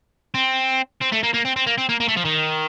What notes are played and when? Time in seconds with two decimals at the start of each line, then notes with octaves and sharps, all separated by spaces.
0.35 C4
1.01 C4
1.12 A3
1.23 A#3
1.34 A#3
1.45 C4
1.56 C4
1.67 A#3
1.78 C4
1.89 A#3
2.00 A#3
2.08 A3
2.17 F3
2.25 D#3